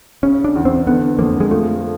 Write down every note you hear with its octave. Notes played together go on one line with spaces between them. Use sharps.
C#3 C#4
D4
E2
C4
D3 B3
F2 A#3
G#3
A3 F4